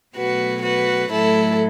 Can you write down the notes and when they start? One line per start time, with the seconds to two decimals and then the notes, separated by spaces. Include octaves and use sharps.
0.15 B2 F#3 A3 F#4 B4
0.63 F#4 B4
1.10 A2 F#3 A3 E4 A4